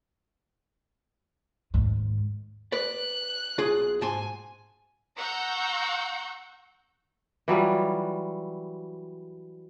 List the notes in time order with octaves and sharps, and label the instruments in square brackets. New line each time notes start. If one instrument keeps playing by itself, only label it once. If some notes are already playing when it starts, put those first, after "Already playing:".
[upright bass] D#2 G#2
[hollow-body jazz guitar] B4 D5 [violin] F#6
[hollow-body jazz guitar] B1 F4 G#4
[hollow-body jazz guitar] G#2 A5 C6 [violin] G#5
[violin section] F#5 A#5 C#6 E6 G6
[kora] E3 F#3 G3 F4